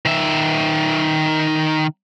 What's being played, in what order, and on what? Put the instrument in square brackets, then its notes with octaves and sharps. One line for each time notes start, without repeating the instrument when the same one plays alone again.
[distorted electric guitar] D#3 E5